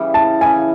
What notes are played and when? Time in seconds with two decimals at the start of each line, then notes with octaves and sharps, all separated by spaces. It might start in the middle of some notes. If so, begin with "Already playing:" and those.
Already playing: C#3 E3 G3
0.14 A5
0.41 C#3 E3 G3 G#5